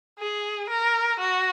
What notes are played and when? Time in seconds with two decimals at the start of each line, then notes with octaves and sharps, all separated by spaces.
0.19 G#4
0.70 A#4
1.20 F#4